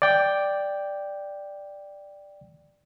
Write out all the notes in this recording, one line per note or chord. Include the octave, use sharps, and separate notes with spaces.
D5 G5